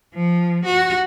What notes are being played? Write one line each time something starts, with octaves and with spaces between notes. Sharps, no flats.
F3
F#4